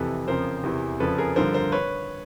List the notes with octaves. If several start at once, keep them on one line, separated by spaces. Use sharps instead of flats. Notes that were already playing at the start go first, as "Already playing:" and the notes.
Already playing: F2 C3 E3 A4 B4
F2 C#3 F3 A#4 C5
E2 C3 E3
F2 C#3 F3 A4 B4
G#4 A#4
G2 D3 F3 A#4 C5
A#4 C5
B4 C#5